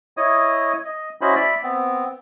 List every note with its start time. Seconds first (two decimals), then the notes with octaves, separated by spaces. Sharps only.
0.17 E4 C#5 D#5 D#6
0.85 D#5
1.21 C#4 E4 F#4 C5 D#5 B5
1.35 D5 E5 B5
1.63 B3 C4